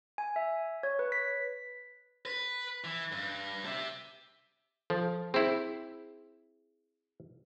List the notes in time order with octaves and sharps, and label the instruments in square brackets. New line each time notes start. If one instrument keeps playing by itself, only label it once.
[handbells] G#5
E5
C#5
B4
B6
[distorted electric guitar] B4
E3
G2
G4 E5
[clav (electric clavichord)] F3 [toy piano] A4
[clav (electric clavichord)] C4 E4 [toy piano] G#4